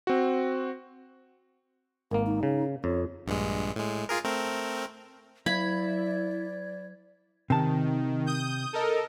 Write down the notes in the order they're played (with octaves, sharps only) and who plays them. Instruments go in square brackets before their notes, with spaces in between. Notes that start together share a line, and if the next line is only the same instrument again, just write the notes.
[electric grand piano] C4 F#4
[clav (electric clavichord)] G#1 A#3 [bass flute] A#4
[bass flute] D#4
[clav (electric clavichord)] C#3
[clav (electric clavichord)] F2 [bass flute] C#5
[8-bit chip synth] A#1 G2 G#3
A2 G#3
F4 G#4 A#4
A3 C4 A#4
[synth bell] F#3 G#6 [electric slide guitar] E4 [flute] D5 [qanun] B5
[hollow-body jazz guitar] C3 A5 [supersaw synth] D#3
[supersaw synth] D#6 G6
A4 A#4 D#5